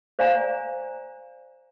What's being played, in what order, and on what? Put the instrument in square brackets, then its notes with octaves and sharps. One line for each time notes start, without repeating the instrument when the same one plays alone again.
[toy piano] C5 D5 F5 G#5 A#5